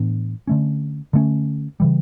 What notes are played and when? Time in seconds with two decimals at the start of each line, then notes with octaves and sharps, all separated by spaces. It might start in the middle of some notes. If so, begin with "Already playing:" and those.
Already playing: A2 E3 B3 D4
0.47 D3 A3 C#4
1.13 D3 A3 C#4
1.80 C#3 E3 G3